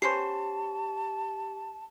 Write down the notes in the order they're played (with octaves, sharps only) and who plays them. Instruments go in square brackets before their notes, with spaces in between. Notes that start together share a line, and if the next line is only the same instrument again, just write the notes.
[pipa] B3 C#4 C5 [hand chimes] G4 [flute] A5 [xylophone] C7